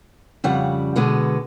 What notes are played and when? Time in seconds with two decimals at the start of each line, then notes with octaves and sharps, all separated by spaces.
0.44 F2 C#3 G3 F#5
0.96 B2 D3 G#3 B3